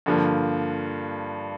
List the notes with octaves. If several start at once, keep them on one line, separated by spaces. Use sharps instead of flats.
G2 D3 F3 A#3